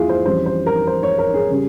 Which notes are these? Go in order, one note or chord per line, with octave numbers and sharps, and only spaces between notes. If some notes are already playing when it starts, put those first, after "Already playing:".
Already playing: F2 E3 A#3 E4 F4 G#4
C5
F2 E3 G3 C#4 C5
C5
A#4
C5
C#5
A#4
G#4
C#3 G3 C#4